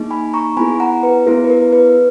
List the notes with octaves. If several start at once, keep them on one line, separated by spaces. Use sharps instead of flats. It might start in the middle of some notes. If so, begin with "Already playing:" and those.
Already playing: A#3 D#4 G#4
G#5 B5
A#5 C#6
B3 E4 G#4 G#5 B5
F#5 A#5
B4
B3 E4 G#4 A#4
B4
A#4
B4